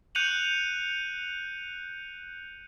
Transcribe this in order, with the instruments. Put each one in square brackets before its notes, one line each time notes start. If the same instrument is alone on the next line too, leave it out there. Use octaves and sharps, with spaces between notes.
[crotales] F#6 G6 C#7 D#7 F7 F#7